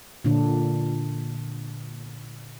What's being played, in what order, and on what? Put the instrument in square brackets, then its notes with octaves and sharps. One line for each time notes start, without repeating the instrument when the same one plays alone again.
[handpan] A#2 D3 D4